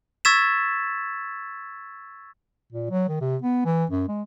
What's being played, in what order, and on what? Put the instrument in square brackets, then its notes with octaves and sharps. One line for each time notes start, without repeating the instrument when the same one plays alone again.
[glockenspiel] C#6 E6 G#6 A6 B6 E7
[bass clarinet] A#2
F#3
D#3
C3
B3
E3
F#2
G#3